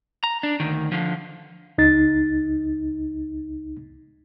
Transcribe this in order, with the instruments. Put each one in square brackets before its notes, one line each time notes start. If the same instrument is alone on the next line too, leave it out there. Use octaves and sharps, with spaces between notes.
[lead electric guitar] A#5
D4
D2 D#3
D3 F3
[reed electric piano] C#2 D#4 A6